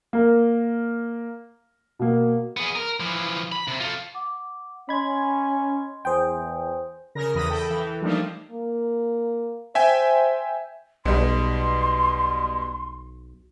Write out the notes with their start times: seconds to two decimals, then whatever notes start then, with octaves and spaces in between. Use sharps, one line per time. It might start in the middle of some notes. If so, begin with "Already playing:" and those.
0.13 A#3 A#4
1.99 B2 A#3
2.57 B3 G#4
2.75 A#4
3.00 E3 F3
3.52 B5
3.68 C3
3.80 F4 A4
4.14 F#5 D6
4.89 C#4 D#5 B5 C6 G#6
6.05 E2 C5 G5 G#5 D#6
7.15 C#3 A#4 A#6
7.35 E2 E3 B5 D#6 A#6
7.48 A4 G5 B5
7.70 E3
8.01 F3 G3 A3 A#3 D4 D#4
8.51 A#3
9.75 C5 E5 G5 G#5
11.05 B1 B2 G3 C6